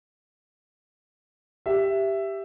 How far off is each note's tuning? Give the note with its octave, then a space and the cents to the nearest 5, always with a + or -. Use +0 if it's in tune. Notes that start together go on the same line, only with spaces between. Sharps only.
G4 +0 E5 +10